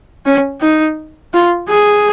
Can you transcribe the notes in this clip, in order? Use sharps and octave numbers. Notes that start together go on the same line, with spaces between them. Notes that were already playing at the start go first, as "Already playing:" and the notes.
C#4
D#4
F4
G#4